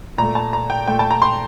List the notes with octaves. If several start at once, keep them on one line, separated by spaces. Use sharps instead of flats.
A#2 A3 A#5
A5
A#5
G5
A#2 A3 G5
A5
A#5
C6